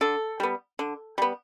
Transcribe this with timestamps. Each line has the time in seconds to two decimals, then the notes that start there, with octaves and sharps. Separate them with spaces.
0.01 D3 A4
0.40 G3 B3
0.79 D3
1.18 G3 B3